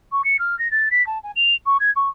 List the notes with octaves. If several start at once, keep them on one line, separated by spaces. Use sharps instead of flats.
C#6
C#7
F6
A#6
A6
B6
A5
G#5
F7
C#6
G#6
C#6